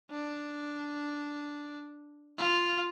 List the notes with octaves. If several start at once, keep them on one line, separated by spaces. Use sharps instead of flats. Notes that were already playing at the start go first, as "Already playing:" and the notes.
D4
F4